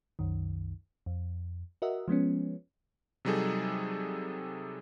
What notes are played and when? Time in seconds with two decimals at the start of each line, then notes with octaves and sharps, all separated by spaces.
0.19 C2 F#2 D#3
1.06 F2
1.82 F#4 A#4 D#5 E5 F#5
2.08 F3 G#3 B3 C#4
3.25 C3 F#3 G3 D#4 G#4 A4